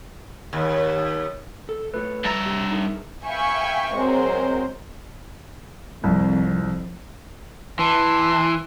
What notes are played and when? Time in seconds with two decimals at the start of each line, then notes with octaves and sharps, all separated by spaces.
0.53 D#2
1.69 A4
1.94 A3 F4 B4 C#5
2.25 G2 E5 A#5 A6 A#6
2.46 C3 G4
2.71 D#4 G#4 A#4
3.25 E5 F5 G5 G#5 B5 C#6
3.94 F#3 G#3 C4 A#4 C5
6.04 C2 F2
7.79 E3 A5 C6